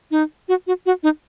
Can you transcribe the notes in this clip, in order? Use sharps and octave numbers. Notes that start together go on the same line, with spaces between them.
D#4
F#4
F#4
F#4
D#4